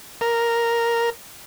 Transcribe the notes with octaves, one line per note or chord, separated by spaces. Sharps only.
A#4